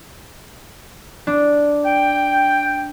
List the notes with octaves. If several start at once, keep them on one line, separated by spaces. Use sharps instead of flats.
D4
G5